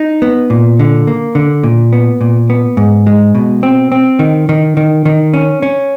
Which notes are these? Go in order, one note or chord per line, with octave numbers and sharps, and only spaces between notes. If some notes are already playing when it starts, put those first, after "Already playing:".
Already playing: D#4
B3
A#2
D3
A#3
D3
A#2
B3
A#2
B3
G#2
G#3
B2
C4
C4
D#3
D#3
D#3
D#3
C#4
C#4